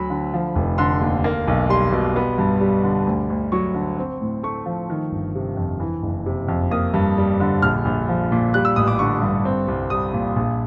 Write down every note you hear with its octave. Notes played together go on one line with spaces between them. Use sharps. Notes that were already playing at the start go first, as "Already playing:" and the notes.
Already playing: D2 F#3 A3 B5
D3
F3
F1
D3 C6
D#2
A#3
B1
G3 C6
B2
B3
G2
G3
D3
D2
D2
F#3 C#6
D3
C4
A2
A3 C#6
F3
D#3
G1
C3
F2
E3
F#1
C3
F2
A#3 D#6
G2
G3
D3
A#1 F6
A#1
F3
A#2
G3 F#6
E6
A1 D#6
D6
D3 C#6
G2
C4
C2
G3 D#6
A#2
A#1